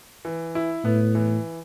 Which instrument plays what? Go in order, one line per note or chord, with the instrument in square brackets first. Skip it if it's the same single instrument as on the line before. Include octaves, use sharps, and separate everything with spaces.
[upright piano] E3
E4
[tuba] A2 [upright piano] B3
[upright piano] E3